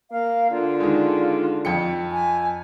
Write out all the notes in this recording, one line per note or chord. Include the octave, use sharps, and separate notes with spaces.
A#3 F5
D3 F4
D#3 G#3
F2 G5 C#7
G#5